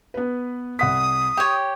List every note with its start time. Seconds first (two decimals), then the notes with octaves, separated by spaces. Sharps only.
0.14 B3 B4
0.79 C2 F#5 D#6 B6
1.37 G4 C#5 G5